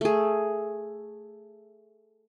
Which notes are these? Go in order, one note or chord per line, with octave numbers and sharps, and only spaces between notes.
A3 G#4